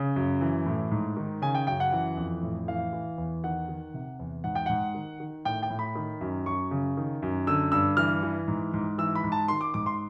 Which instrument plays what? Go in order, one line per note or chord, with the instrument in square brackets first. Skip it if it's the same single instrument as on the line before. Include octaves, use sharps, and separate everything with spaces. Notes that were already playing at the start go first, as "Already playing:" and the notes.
Already playing: [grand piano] C#3
F#2
E3
A2
G#2
D#3
C#3 G#5
G5
F#2 G5
F#5
E3
F2
A2
E3 F5
E3
E2
D#3 F#5
D#3
C3
E2
G#2 F#5
G5
G#2 F#5
D#3
D#3
A2 G5
G5
A2
B5
D#3
F#2
F#2 C#6
C#3
D#3
F#2
D3 E6
G2 E6
E3 F6
E3
G#2
G#2
E3 E6
B5
G#2
A5
D#3 C6
D6
G#2 D6
C6